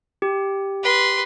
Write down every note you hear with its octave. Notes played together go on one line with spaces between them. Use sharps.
G4
B4 C6